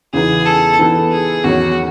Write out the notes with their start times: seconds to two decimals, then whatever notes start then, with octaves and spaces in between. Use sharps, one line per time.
0.13 E2 C#3 E3 B3 D#4 G#4
0.46 A4
0.79 E3 B3 D#4 A4
1.11 G#4
1.44 E2 D#3 F#3 C#4 F#4